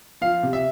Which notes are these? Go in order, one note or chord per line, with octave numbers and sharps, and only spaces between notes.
F3 F5
C3
E5